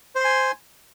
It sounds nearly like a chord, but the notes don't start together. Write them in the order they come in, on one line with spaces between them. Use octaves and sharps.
C5 C6 G#5